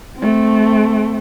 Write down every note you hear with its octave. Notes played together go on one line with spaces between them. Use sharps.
A3 C4